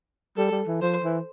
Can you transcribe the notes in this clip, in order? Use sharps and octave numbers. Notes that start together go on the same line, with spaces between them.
G3 A4
G3
E3
F3 C5
E3